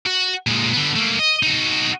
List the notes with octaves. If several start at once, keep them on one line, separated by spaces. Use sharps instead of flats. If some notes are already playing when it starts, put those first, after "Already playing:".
F#4
A#2 G#3
D3 B3
A3 A#3
D#5
D#4 F#4